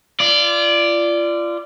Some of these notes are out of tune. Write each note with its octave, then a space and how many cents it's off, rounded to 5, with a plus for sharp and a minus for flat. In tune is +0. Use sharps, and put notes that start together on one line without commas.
F4 -30 D5 +0